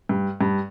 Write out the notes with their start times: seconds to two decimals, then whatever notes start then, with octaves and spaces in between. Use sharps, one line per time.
0.09 G2
0.41 G2